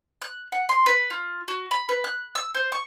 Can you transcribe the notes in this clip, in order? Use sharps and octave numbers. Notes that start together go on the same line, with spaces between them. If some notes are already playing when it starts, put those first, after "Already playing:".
F#6
F#5
C6
B4
F4
F#4
B5
B4
F#6
E6
C5
C#6